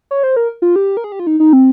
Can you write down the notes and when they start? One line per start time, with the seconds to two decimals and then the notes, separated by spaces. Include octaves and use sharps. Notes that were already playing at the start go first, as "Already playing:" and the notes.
0.11 C#5
0.23 C5
0.36 A#4
0.62 F4
0.76 G4
0.97 A#4
1.04 G#4
1.12 G4
1.19 F4
1.27 D#4
1.40 D#4
1.53 C4